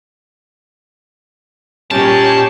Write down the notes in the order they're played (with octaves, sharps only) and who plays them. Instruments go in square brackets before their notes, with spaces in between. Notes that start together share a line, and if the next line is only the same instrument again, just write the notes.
[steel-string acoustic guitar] A#2 C#4 [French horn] G#3 [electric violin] G4 C#5 [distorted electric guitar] A5